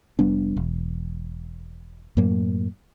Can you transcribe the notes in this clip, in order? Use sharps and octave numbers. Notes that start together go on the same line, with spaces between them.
F1 G3 B3 D4
E1
F#2 A2 F#3 A#3